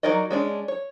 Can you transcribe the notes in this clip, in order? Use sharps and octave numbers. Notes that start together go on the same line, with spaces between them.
F#3 D#4 A#4 D5 D#5
G#3 C#4 D4
C#5